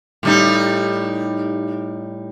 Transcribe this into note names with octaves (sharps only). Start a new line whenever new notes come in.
A2 G3 D#4